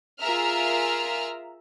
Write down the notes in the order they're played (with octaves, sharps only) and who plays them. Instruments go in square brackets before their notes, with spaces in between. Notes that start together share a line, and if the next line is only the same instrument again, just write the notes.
[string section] F4 G#4 A#4 E5 A#5 F6